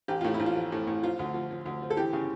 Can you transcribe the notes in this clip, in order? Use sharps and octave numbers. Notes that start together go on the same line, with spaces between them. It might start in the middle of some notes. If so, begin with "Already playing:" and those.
A1 G4
A2 F4
E4
A1
F4
F3
A2
A2
F3 F4
D2
F3
F3
D2
F3
A4
E3 G4
C#3